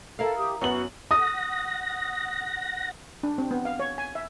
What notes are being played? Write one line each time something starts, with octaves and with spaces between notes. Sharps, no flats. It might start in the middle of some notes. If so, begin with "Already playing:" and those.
E4 A4 A#4 F5
G4 D#6
F#2 B3 C#4 F#4 F#7
F#5 D#6 A#6
D4
C4
B3
F5
C#5
G#5
E5